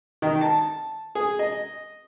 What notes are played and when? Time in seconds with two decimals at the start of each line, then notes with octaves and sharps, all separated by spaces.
0.22 D#3
0.41 A5
1.15 G#4
1.39 D#5